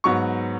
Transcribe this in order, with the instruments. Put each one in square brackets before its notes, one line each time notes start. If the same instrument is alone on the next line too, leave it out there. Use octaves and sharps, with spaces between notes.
[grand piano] G#2 F#3 B3 [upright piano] C#6